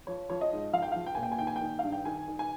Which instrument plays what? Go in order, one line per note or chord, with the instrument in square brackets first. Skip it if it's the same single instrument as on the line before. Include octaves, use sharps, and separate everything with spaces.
[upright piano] F3 C#5
F3 C#5
D#5
G#2
F3 F5
G5
F3 F5
G5
A#2 G#5
G5
G#5
D#3 G5
G#5
G5
D#3
G2 F5
G5
D#3 G#5
D#3
G#5